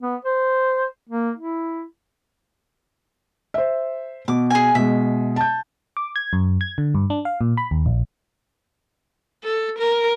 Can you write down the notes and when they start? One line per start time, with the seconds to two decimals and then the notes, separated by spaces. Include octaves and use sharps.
0.01 B3
0.25 C5
1.09 A#3
1.37 E4
3.54 C5 E5
4.28 B2 D6
4.50 G#4 G#5
4.75 B2 G#3 E5
5.36 A5 G6
5.97 D6
6.16 G#6
6.33 F#2
6.61 G#6
6.78 D3
6.95 G2
7.10 D4
7.25 F5
7.41 A#2
7.57 B5
7.71 D#2
7.86 A#1
9.43 A4
9.78 A#4